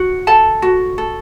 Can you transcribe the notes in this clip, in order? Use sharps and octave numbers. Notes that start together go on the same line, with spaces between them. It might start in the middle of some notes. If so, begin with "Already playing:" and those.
Already playing: F#4
A4 A5
F#4
A4